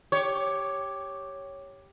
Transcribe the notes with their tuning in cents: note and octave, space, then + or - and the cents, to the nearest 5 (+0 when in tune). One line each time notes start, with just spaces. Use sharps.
G4 +0 C#5 +0